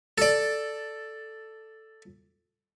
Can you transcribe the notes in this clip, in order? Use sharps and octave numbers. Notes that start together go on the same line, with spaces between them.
A4 D5